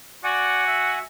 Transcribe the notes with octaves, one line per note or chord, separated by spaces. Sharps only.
F#4 D5 F#5 G#5
E5